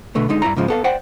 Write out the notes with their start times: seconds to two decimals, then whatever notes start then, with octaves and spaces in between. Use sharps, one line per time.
0.15 B2 D3 A3 B3
0.29 D3 G#3 D#4
0.42 G2 E4 D5 A#5
0.56 G#2 C#3 F3 G#3
0.68 B3 A4 F5
0.84 C5 D5 F#5 G5